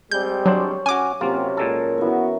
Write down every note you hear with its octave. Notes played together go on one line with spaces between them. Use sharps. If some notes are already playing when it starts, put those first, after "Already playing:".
G3 G#3 C4 G6
F#3 D4 C5 C#5
C#4 F#4 G#5 D6
C3 F#3 A#3 C#4 F4
A#2 G#3 A4 A#4
E3 B3 E4 F#4 C#6